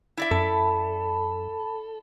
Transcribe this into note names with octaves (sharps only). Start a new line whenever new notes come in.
E4 D5 E5
F#2 A4 A5 B5